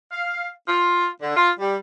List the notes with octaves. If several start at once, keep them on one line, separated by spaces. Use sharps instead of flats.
F5
F4
D3
F4
G3